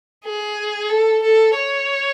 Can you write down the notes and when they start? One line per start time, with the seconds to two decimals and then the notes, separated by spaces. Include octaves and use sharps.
0.25 G#4
0.90 A4
1.23 A4
1.56 C#5